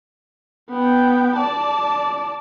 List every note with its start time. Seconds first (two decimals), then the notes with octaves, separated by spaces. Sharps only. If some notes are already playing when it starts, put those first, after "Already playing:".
0.70 B3 G5
1.36 D5 A5